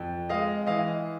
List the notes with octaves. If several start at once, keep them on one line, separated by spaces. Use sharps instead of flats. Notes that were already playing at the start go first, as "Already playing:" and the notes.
Already playing: F2
G#3 D#5 F5
E3 D#5 F5